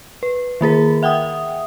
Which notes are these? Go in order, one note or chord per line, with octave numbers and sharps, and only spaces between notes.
B4
D#3 A#3 G#4 A#4
E5 F#5 G5 D#6